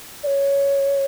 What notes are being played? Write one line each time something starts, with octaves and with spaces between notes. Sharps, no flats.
D5
C#5